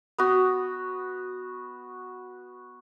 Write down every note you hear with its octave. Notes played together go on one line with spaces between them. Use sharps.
B3 F#4